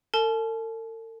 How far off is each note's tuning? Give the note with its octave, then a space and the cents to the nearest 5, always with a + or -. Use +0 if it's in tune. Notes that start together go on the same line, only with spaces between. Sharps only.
A4 +45 A5 -40